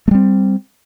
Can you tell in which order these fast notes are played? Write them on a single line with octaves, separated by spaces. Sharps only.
A3 G3 C4